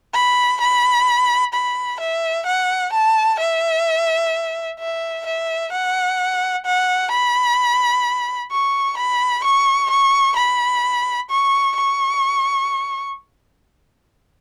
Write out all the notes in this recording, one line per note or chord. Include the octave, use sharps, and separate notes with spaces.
B5
B5
B5
E5
F#5
A5
E5
E5
E5
F#5
F#5
B5
C#6
B5
C#6
C#6
B5
C#6
C#6